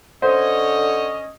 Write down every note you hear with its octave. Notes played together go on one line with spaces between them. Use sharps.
D3 C#4 C5 C#5 D#5